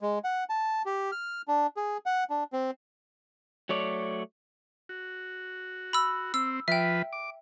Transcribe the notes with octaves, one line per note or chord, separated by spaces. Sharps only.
G#3
F#5
A5
G4
F6
D4
G#4
F#5
D4
C4
F#3 A3 C#5 D5
F#4
B5 E6
C4 E6
F3 B4 E5 G5
D6